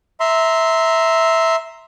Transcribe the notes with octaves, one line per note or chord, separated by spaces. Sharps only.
E5 A#5 C6